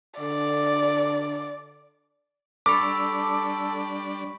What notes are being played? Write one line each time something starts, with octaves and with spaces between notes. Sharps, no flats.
D3 D5
G3 D4 A4 D5 B5 C#6 D6 B6